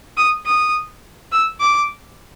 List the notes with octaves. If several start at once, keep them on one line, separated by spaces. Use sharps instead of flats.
D#6
D#6
E6
D6